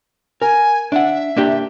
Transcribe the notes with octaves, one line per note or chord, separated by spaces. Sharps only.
A#4 G#5
D4 E5 F#5
A#3 D4 G4